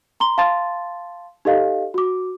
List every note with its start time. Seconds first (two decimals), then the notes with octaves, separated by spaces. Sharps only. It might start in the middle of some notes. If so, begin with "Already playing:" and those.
0.20 A#5 C6 G7
0.38 F5 A5 C6 A6
1.45 D#4 G4 A4 D#5 F5
1.94 F#4 D6